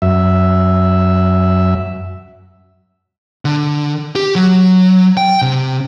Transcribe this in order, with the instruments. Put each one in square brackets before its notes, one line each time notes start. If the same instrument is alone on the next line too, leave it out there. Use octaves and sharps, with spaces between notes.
[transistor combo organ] F#2 E5
[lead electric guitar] D3
G4
F#3
G5
C3